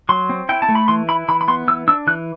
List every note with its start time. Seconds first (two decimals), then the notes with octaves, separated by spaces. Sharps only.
0.09 F#3 C6
0.29 C4
0.49 E4 G5
0.62 A5
0.69 A3
0.75 B5
0.88 E3 C6
1.08 E4 B5
1.28 E3 B5
1.41 B5
1.48 B3 C6
1.68 E3 E6
1.88 D4 E6
2.07 E3 F#6